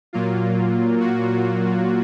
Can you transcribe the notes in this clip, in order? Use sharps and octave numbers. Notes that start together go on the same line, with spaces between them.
A#2 F#3 A#3 F4
F#4